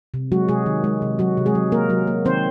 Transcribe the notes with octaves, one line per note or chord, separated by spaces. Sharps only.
C3
F#3 G#3 F#4
C3 G#3 G#4
D#3
G#3
C3
F#3 F#4
C3
G#3 G#4
F#3
A#3 A#4
F#3
A#3
D#3 C4 C5